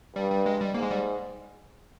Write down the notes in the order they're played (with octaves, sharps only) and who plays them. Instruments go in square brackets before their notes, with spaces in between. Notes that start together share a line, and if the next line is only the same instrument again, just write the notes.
[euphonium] G2 [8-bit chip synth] G3
[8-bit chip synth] G3
G#3
G3
[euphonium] G#2 [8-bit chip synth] A#3
[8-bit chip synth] G#3
G3